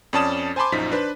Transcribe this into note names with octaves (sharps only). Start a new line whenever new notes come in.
F2 C#4 D5 A5 D#6 E7
C5 G#5 A5 B5 C6 D6
A#1 F#2 F3 D#4 B6
D4 B4 C5